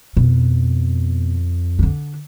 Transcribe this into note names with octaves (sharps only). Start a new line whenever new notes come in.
F2 B2
D3 D4